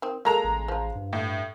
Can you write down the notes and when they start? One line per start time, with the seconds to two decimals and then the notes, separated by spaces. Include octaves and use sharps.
0.02 D#3 C4
0.25 G#3 A#3 A4 A#5 F7
0.44 A1
0.68 F3 F4
0.95 G2
1.13 A2